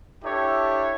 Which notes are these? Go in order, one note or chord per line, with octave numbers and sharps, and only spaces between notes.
D4 E4 G4 A4 C#5 E5